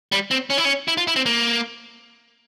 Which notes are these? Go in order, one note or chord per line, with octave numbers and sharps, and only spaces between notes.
G3
C4
C#4
E4
C#4
E4
F4
E4
C4
A#3